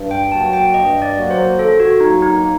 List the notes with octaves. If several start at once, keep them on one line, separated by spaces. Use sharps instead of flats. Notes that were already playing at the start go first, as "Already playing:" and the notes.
Already playing: G2
G5
F#3 A#3 F#4 A5
G5
G2 D#5
D5
F#3 A#3 F#4
C5
D#3 A4
F#4
F#3 A#3 D#4
D#4